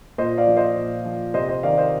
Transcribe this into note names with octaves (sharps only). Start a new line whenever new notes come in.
A#2 C5 D#5
D5 F5
F3
C5 D#5
A#2
F3
C3 C5 D#5
C5 D#5
D#3 D5 F5
C5 D#5